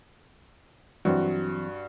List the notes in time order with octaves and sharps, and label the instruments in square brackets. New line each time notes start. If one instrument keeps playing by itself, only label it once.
[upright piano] G2 [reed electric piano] E3 F#3 C4 [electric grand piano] F#4